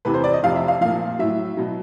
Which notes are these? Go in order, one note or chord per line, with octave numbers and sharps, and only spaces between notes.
E2 C3 E3 B4
C5
D5
D#5
F2 C3 F3 F5
E5
F5
A#2 F3 F5
A2 F#3 E5
B2 F#3